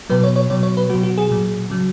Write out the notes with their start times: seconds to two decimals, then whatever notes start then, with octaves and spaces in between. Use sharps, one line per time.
0.10 B2 F#3 B4
0.24 C#5
0.36 C#5
0.50 B2 F#3 C#5
0.63 C#5
0.77 B4
0.90 F#3 F#4
0.95 B2
1.03 F#4
1.18 G#4
1.31 A#2 F#3
1.70 C#3 F#3